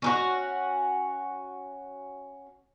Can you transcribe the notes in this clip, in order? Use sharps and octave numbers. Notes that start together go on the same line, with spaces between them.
C#4 D#4 F#4